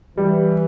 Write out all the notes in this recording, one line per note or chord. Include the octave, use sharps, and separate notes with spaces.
E3 G3